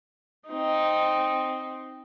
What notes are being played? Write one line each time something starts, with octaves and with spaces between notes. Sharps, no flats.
C4 D#4